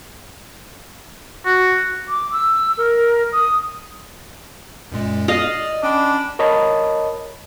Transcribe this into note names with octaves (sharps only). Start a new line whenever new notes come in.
F#4
D6
E6
A#4
D#6
F#2 A#2 G#3
D5 D#5 F5
C#4 D4 G5 B5
A#4 C#5 D#5 A5 B5